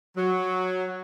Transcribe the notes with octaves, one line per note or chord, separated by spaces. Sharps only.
F#3